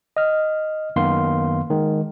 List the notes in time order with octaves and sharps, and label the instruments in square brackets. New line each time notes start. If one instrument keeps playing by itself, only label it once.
[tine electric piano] D#5 F6
F#2 D#3 A#3 B3 F5 C6
D#3 G#3